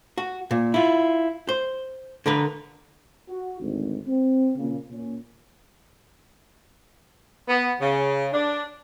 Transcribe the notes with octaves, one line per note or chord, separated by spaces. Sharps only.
F#4
A#2
E4 F4
C5
D3 A#4 B4
F#4
G#1 D2
C4
A#2 C#3 A#3
A#2 C#4
B3
C#3
D4